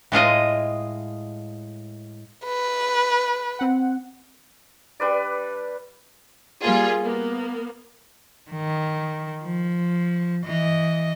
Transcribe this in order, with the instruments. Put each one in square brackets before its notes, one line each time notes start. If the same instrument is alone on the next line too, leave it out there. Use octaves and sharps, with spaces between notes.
[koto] A2 G#3 F4 D#5
[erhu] B4
[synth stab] C4 F#5
[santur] G3 D4 B4 D5
[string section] G3 A#3 F4 G#4
A#3 B3
[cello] D#3
F3
E3 D#5